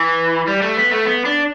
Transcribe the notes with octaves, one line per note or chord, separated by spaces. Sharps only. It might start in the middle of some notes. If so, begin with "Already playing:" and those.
Already playing: E3
G3
A3
B3
A3
B3
D4